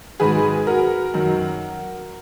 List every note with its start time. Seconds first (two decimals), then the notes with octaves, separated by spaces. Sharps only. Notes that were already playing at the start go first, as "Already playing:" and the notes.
0.20 G#2 D#3 F#3 G#4 B4
0.67 F#4 A#4
1.14 F#2 D#3 F#3